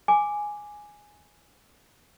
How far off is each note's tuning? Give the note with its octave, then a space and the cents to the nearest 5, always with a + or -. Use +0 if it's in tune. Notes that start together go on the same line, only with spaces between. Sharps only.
G#5 +0 D6 +0